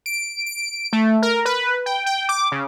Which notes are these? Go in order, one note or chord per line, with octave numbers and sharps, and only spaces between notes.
D7
D7
A3
A#4
B4
G5
G5
D6
C#3